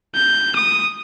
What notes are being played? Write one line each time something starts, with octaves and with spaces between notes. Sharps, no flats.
G6
D#6